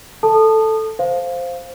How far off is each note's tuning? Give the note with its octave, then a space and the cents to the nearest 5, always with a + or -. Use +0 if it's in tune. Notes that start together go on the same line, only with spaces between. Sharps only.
A4 +0 A5 +0 D#6 -25
C5 +0 F5 +0